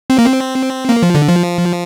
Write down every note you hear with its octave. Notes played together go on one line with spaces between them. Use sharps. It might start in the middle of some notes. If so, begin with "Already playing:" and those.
C4
A#3
C4
A#3
F3
D3
F3